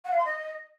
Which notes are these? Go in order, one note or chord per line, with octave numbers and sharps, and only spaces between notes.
F#5
F5
C6
D#5